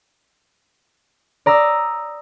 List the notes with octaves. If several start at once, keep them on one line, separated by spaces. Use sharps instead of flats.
D5 A#5 D#6 E6